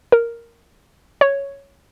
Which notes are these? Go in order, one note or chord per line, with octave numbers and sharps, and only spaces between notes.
A#4
C#5